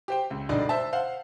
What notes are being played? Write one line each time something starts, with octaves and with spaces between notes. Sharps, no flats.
G4 C5 G5
C#2
E1 G2 D3 D4 D#4 D5
C5 E5 A5
C5 F5 F#5